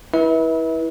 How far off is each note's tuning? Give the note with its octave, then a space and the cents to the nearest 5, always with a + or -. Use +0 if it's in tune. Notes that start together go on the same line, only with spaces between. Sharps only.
E4 -20 B4 -30 E5 -35